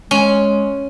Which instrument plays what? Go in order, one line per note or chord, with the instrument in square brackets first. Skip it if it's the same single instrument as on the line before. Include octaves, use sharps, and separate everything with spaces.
[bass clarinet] G#3 [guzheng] C#4